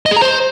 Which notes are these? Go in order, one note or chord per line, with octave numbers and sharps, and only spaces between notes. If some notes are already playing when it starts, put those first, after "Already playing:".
D#5
G#4
A#5
C5